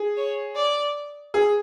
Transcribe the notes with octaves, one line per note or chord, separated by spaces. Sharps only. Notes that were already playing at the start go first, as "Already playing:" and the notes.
Already playing: G#4
C#5
D5
G#4